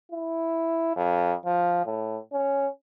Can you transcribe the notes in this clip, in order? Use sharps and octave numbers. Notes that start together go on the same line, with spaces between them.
E4
F2
F3
A2
C#4